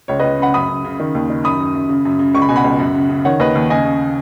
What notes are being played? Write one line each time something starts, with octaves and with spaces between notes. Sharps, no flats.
C#2 C#5
B4 D#5
C#2
C#3 F#5 B5
F#2 B5 D#6
F#2
C#3
D#3
D#2
D#3
F#2 B5 D#6
F#2
F#2
C#3
F#2
C#3
C#2 C#6
B5
B2 G#5
F#5 B5
C#2
F#2
C#3
C#3
D#3 C#5 F#5
D#2 B4 D#5
D#2
C#3 D#5 G#5
C#3